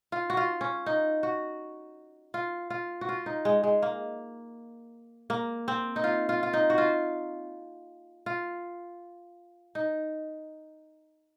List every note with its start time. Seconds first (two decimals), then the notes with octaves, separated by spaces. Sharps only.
0.12 F4
0.30 F#4
0.37 F4
0.61 C#4
0.86 D#4
1.23 F#4
2.34 F4
2.70 F4
3.01 F#4
3.09 F4
3.26 D#4
3.45 G#3
3.64 G#3
3.82 A#3
5.30 A#3
5.68 C4
5.96 D#4
6.04 F4
6.29 F4
6.43 F4
6.53 D#4
6.70 F#4
6.78 F4
8.26 F4
9.75 D#4